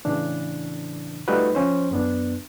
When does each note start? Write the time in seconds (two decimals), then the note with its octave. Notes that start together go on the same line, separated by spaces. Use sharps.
0.05 A2 C#3 E3 D4
1.28 G3 A3 D#4 F4 F#4 B4
1.55 F3 C#4 C5
1.91 F#2 B3 D4